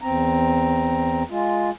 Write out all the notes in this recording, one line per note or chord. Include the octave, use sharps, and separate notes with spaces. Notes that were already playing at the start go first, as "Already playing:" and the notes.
E2 C4 A#5
G#3 F4